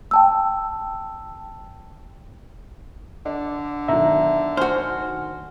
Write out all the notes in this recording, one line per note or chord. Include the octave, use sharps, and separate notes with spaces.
G5 A5 E6
D3 D5
B1 D#3 E5 A#5
F#4 C5 G#5 F6